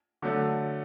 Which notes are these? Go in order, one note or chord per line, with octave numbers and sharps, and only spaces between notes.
D3 F#3 A3